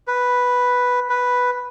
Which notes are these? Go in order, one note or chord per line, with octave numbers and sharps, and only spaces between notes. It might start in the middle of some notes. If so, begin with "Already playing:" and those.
B4
B4